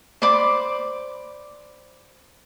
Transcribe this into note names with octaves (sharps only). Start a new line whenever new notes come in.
C5 D5 B5 D6